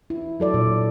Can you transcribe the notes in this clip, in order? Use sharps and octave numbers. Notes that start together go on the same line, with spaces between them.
E4
F#3 A4 D5
A#2